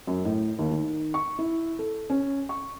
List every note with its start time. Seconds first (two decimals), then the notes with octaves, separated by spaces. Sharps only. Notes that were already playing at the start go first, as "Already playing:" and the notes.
0.07 F#2
0.25 A2
0.59 D#2
0.71 D#3
1.14 C#6
1.39 E4
1.79 A4
2.10 C#4
2.49 C#6